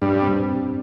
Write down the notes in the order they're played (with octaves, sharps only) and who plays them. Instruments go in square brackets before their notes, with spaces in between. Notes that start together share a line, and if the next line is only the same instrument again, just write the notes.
[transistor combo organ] G2 [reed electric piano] D4
[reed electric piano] C4